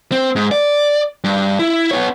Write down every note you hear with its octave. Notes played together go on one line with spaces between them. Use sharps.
C4
G#2
D5
G2
E4
B3 C#5